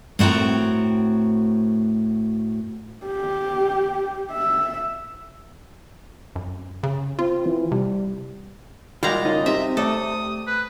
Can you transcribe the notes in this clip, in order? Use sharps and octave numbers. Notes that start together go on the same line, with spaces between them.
A2 C4 F#4 A#4 A#5
G4
E5
F#2
C#3
C4 F4
E3
C3 G3
A#2 G3 G#3 F4 F#4 A#5
C#2 F#2 D#4 F4 D#5
C3 C4 D#4 E5
A3 A4 D5 D#6
B4